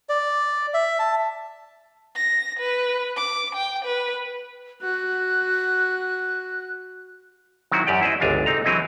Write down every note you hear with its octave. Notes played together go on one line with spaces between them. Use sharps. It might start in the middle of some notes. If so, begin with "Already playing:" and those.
D5
E5
A5
A#6
B4
D6
G5
B4
F#4 F#6
D#3 F#3 C4 E4 F#4
F#2 G4 D5 G5
E4 C5 D5 D#5
G1 C#2 D4 F5 G#5
C4 D#4 A#5
E3 F#3 C4 E4 D#5